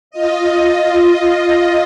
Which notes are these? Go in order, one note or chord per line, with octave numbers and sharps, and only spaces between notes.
F4 D#5